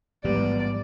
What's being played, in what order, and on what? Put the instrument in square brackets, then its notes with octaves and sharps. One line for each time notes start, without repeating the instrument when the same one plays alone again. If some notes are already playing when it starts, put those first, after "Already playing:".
[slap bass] A1 F3 G#3 [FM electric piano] G#2 G3 [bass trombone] B3 [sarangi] D5